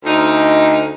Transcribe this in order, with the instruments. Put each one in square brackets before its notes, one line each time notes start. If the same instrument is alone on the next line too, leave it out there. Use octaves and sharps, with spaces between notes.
[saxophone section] D2 D#4